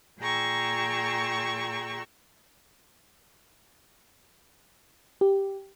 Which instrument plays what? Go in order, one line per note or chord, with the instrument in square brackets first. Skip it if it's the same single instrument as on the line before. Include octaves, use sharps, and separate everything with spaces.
[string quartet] A#2 G#4 G5 A#5 C#6 E6
[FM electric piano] G4